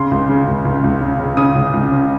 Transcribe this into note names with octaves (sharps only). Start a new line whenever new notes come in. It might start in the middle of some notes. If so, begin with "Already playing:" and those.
Already playing: C#3 C6
C#2
C#3
C#2
C#2
C#2
C#3
C#3
C#3 D#6
C#2
C#2
C#3